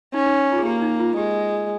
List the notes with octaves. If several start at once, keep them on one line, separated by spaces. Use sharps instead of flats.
C#4 D#4
D#4
F4
G#4
A#3 G4
D#4
F4
G#3 G4